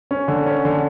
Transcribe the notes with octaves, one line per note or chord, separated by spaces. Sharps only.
C#4
D3
C#4
D3